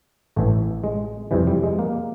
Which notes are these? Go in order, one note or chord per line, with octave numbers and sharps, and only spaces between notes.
A1 A2 E3 A3
G#3
F2 C3 E3 G3
G3
G#3
A#3